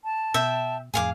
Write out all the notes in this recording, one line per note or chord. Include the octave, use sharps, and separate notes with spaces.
A5
B2 E5 G5
F2 A2 G#4 F5 D6